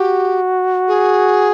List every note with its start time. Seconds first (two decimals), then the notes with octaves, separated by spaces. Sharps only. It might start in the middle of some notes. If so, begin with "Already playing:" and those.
Already playing: F#4 G4
0.88 G#4